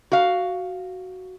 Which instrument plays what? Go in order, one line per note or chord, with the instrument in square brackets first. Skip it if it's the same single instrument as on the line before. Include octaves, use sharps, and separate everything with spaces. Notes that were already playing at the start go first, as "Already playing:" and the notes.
[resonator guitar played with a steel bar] F#4 F5